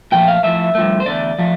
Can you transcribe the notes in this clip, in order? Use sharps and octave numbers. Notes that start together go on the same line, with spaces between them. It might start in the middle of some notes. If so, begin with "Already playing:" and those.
A#2 F3 A3 G5
F5
A2 F3 A3 E5
G2 F3 A3
C5
E2 D3 A3 D5
F3 A3